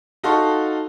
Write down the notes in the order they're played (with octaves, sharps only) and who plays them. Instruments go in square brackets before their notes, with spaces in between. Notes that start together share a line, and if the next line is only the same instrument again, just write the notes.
[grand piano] D#4 F#4 A4 F5 C6 C#6